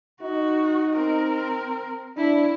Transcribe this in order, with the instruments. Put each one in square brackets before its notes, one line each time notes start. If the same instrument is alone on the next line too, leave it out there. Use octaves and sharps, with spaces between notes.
[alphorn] D#4 [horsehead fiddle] F#4
[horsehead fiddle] C4 A#4
[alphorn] D4 [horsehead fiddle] E4